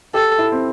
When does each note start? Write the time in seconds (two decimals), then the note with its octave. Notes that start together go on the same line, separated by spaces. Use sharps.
0.14 G4 A4
0.38 E4
0.52 C4